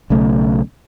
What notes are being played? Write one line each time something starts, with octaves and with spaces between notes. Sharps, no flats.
B1 C#3 A3